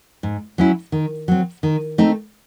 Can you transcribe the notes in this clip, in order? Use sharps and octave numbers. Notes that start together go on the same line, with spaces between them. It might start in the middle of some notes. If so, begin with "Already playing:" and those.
G#2
F#3 C#4 E4
D#3
F#3 C4
D#3
A3 C4 D#4